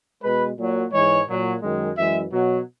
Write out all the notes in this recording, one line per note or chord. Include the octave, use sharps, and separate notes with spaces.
B2 G#3 B4
A#2 F#3
G#2 E3 G#3 C#5
A#2 F#3
F#2 D#3 G#3
F#2 E3 G#3 E5
B2 F#3